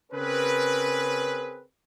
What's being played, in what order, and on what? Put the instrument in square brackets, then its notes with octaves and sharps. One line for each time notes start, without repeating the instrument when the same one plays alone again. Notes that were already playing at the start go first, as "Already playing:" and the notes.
[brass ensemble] C#3 C4 C#4 G#4 A#4 B4